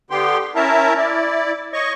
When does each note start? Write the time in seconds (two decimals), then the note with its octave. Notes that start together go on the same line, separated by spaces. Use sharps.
0.10 D3 B3 G4 G5 C6
0.55 C#4 E4 A#4 E5 A5 A#5
0.97 E4 D5
1.73 C#5 D#5 C#6